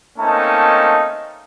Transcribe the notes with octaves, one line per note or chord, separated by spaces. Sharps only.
A3 A#3 C4 C#4 D#4 A5